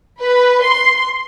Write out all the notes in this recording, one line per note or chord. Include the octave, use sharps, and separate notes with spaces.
B4
C6